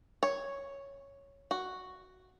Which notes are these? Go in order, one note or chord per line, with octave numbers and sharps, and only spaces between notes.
C#5
F#4